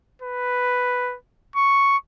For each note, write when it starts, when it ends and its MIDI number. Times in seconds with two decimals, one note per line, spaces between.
0.22 1.16 71
1.56 1.97 85